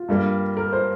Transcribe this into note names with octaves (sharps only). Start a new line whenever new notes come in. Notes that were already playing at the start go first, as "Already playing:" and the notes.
Already playing: F4
G2 G3 A#3
A#4
C5